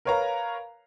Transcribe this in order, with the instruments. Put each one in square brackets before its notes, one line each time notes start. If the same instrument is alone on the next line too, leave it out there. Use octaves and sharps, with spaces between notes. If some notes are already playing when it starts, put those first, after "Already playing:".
[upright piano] A#4 B4 C#5 F5 A#5